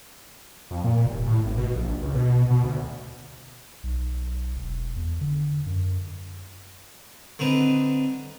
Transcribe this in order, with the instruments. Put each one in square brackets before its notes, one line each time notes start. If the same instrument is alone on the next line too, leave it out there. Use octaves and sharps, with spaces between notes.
[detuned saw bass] F2
A#2
D#1
A2
G#1
B2
A#1
C#2
B2
B2
D2
[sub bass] B1
E1
E2
D3
F#2
[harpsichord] D3 C4 D#4 B4